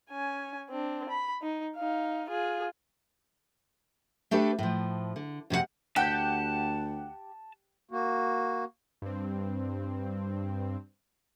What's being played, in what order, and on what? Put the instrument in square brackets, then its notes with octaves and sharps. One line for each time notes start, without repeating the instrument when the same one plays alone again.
[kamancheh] C#4 G#5
C4 D4
B5
D#4
D#4 F5
F4 G#4
[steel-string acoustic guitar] A3 D4 G4 A4 B4
A2 F3
D3
F2 C3 F#4 F#5
[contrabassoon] D2 [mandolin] G4 [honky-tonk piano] F#5 G6 [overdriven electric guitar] A5
[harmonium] A#3 F#4
[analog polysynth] G2 C4